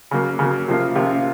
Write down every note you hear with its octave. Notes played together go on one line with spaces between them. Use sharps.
C#3 F#3 A#3
C#3 F#3 A#3
C3 F3 A#3 F4
C3 F3 A#3 F4